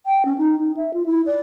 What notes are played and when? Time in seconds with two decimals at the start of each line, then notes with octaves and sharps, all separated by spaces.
0.06 G5
0.25 C#4
0.38 D#4
0.59 D#4
0.77 E5
0.94 F4
1.06 E4
1.26 D5